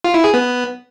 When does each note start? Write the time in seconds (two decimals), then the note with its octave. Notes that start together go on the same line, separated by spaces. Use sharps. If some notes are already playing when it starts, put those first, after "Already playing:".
0.04 F4
0.14 E4
0.24 G#4
0.34 B3